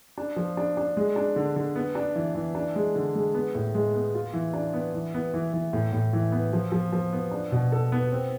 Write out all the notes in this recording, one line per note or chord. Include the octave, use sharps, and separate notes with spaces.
D4
F3
D4
D4
G#3
D4
D3
D3
B3
D4
E3
E3
D4
G#3
D3
G#3
B3
A2
G#3
B3
F4
E3
D4
B3
E3
B3
E3
E3
A2
A2
E3
B3
F3
F3
F3
B3
D4
B2
A4
B3
C4